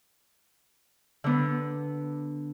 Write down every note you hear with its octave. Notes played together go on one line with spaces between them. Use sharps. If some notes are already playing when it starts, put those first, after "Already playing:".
D3 B3